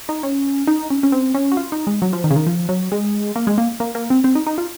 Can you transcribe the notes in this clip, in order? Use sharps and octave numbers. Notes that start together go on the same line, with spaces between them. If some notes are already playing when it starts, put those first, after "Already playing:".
D#4
C#4
D#4
C#4
C#4
C4
C#4
F#4
F4
D#4
G#3
F#3
F3
D#3
C#3
D#3
F3
F#3
G#3
A#3
G#3
A#3
A#3
A#3
C4
C4
D#4
D#4
F4